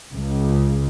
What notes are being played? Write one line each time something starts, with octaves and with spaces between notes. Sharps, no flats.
C#2